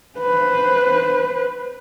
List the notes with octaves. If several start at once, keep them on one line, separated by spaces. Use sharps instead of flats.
B4 C5